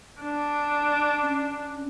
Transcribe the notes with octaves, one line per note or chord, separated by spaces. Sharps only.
D4
C#4